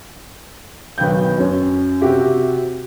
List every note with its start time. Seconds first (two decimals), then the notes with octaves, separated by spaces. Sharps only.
0.98 B1 D#3 B4 G5 G6
1.38 F#2 C#4
2.01 C3 F#4 G4 E5